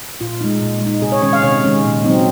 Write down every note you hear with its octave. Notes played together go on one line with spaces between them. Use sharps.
A#2 F4
G#3 D#4
A#2
G#3
D#4
C3 G#4
C#5
D#3 G#3 C#4 C#5
F5
C3 C#5
D#3 G#3 C#4
A#2
F#3 C4 D#4